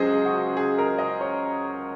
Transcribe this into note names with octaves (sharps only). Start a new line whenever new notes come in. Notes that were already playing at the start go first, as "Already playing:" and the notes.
Already playing: C#2 C#3 F#3 G#4 C5 D#5
F#4
G#4
A#4
D#5
C#5